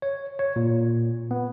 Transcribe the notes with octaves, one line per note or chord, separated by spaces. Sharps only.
C#5
C#5
A#2
B3